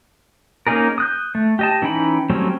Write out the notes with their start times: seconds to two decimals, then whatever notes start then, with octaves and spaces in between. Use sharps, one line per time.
0.67 A#3 C#4 D#4 G#4 A#4
0.98 D#6 F#6 G6
1.35 A3
1.59 G4 D#5 A5
1.82 E3 C#4 D#4 G5 B5
2.30 F#3 G3 A3 C4 C#4